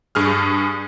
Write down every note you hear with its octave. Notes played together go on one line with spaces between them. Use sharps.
G2 G#4 F6